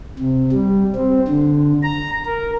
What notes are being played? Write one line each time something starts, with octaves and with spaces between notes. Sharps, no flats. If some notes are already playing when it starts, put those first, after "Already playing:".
C3
G3
C4
D3
A#5
A#4